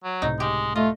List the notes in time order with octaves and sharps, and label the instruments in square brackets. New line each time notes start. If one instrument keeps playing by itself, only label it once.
[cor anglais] F#3
[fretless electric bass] C#2 A2 C3 [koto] D#4
[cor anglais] G#3 [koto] G4
[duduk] A3 [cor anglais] F4 [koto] D#5